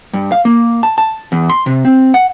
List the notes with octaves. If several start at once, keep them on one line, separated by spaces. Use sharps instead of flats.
G2
F5
A#3
A5
A5
E2
C6
C3
C4
F#5